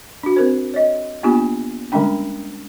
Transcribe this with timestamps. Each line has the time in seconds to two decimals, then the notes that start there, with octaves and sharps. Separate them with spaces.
0.23 D4 F#4
0.36 C4 A#4 C5
0.74 C#5 D#5
1.23 A#3 B3 D4 F4 G4 G#5
1.92 D3 G3 G#3 C#4 D4 G5